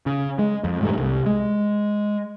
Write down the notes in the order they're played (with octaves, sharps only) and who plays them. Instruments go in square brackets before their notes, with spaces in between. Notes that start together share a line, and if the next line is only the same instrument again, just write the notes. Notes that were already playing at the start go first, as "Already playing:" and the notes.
[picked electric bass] C#3
G#3
F2
E1 G#2 G3 A3
C2
G#3